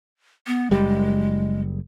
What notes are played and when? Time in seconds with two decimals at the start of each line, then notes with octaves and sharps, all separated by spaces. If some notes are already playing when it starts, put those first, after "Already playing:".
0.47 B3
0.71 F#1 G3 G#3